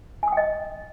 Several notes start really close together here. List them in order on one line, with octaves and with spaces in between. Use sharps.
G#5 D#6 G5 D#5